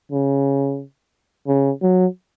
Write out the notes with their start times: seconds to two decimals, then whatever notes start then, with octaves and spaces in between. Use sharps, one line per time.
0.12 C#3
1.47 C#3
1.82 F#3